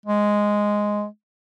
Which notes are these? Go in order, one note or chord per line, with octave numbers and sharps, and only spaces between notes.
G#3